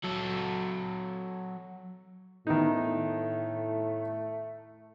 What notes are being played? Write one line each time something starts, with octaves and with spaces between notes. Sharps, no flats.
F#3 A4
A2 D#3 A3 B3 D#4